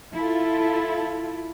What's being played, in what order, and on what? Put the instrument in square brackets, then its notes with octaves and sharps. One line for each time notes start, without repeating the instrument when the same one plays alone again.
[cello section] E4 F4 A4